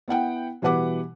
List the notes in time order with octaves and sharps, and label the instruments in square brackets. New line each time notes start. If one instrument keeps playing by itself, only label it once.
[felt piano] B3 E4 F#5 G5
B2 E3 G3 B4 F#5 D6